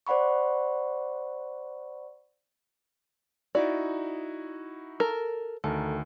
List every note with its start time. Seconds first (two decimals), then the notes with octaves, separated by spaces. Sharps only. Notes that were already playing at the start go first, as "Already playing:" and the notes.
0.07 C5 D5 F#5 B5 C#6
3.55 D#4 E4 F#4 D5
5.00 A4 A#4
5.64 D2 D#3 A4 A#4